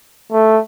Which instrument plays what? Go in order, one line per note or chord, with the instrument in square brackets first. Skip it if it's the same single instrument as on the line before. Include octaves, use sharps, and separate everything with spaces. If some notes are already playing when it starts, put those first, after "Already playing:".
[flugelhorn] A3